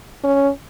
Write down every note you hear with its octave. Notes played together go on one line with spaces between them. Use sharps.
C#4